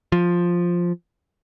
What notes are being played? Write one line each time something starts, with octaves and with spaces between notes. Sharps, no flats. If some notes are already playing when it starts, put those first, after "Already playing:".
F3